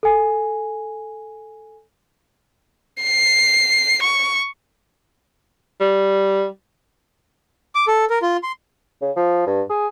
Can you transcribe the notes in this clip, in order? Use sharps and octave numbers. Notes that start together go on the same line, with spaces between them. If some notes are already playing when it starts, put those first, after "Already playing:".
A4 G#5
C7
C#6
G3
D6
A4
A#4
F4
C6
C#3
F3
G2
G#4